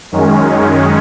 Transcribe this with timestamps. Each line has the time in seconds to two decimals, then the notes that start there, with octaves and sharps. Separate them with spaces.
0.12 F#2 D#3 G#3 C#4